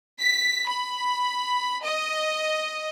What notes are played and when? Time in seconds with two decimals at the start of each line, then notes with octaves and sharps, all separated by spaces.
0.19 B6
0.67 B5
1.81 D#5